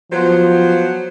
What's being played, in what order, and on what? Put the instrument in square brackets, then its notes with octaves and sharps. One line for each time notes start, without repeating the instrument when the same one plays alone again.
[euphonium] F3 [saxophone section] F#3 B3 C5